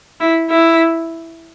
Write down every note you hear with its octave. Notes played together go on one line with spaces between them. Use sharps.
E4
E4